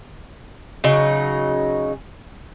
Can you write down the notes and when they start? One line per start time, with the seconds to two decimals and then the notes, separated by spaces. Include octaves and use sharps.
0.84 C#3 F#3 D#4